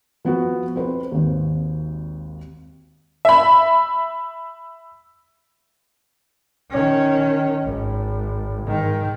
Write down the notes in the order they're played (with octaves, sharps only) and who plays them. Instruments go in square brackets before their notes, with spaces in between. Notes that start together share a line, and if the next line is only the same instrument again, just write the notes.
[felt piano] F3 B3 F#4
C4 B4 C5
G#1 D#2
[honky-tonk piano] E5 B5
[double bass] D#3 C#4
G#1
G#2 D#3